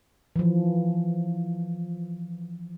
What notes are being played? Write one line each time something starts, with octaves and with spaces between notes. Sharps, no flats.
E3 F3